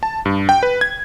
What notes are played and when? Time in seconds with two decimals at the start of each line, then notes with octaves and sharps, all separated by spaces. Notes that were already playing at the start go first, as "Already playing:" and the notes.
0.03 A5
0.25 G2
0.49 G5
0.63 B4
0.81 G#6